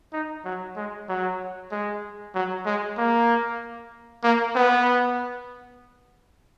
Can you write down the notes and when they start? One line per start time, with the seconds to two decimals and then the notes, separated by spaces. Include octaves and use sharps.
0.13 D#4
0.45 F#3
0.76 G#3
1.09 F#3
1.72 G#3
2.35 F#3
2.66 G#3
2.98 A#3
4.24 A#3
4.55 B3